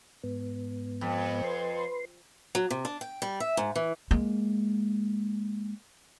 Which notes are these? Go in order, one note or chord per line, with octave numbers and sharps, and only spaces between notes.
G#2 B3
F2
B4 C6
F#3
C3
D4
G5
G3
E5
G#2
E3
G#3 A#3